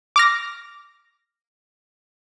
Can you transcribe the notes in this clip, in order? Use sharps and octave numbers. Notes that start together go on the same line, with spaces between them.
D6 F6 A#6